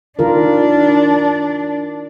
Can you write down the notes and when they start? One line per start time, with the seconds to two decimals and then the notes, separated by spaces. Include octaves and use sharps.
0.19 D#3 D4 F4 A#4